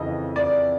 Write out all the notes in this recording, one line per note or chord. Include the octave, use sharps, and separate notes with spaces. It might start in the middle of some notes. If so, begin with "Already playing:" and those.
Already playing: F2 C#3 E3 D#5
D5